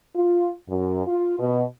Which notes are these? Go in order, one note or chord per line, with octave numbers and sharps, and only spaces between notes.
F4
F#2
F4
B2